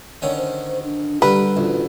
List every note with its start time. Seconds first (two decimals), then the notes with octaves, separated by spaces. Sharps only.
0.22 D3 D#3 C#4 C#5
0.37 C5
0.83 D4
1.22 D3 G3 G4 A#4 B4
1.56 A1 D2 F4